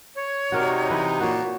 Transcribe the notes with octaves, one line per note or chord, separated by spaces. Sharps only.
C#5
C3 D#4 F#4 A#4 D5
E3 B4
A#2 F#4 C#5